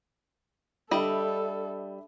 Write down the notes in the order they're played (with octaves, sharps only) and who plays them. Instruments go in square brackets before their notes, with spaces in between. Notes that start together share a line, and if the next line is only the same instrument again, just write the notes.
[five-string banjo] G3 D#5 [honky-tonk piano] D4 E5 B5 [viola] A4